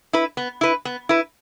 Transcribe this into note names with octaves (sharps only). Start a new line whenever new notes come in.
E4 B4
B3
E4 B4
B3
E4 B4